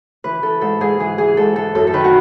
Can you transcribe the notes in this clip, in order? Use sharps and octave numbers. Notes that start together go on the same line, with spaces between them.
E3 B4
E3 A4
G#2 A4
G#2 G#4
E3 G#4
E3 G#4
G#2 A4
E3 A4
F#2 A4
A4
D#3 B4
F#4